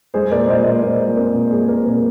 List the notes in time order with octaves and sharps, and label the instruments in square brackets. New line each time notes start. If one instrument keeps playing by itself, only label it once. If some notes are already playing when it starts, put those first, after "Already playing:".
[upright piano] G#3 G#4 C5
A#2 A#4 D5
A#2 C5 D#5
A#2 C5 D#5
A#2 A#4 D5
G#3
C4 A#4
A#2
G#3 G#4
C4 A#4
A#2 A#4